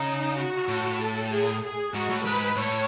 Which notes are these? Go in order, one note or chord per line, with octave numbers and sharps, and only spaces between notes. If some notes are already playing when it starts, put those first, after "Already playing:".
Already playing: C#3 D#4
F#4
A2
A4
G#4
G#4
G#2 F#4
A2
G#2 B4
A2 C#5